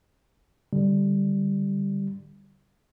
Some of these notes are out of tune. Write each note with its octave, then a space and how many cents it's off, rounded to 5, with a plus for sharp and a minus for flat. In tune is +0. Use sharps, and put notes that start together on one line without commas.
D3 +0 G3 +0